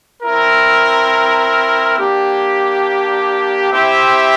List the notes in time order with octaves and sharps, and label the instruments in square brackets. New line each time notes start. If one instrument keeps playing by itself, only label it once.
[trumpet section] C4 E4 A#4
A#3 D4 G4
C4 E4 G4 C5 E5